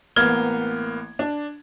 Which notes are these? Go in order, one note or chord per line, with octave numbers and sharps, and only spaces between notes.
A1 A#3 B3 F6 G#6 G7
D4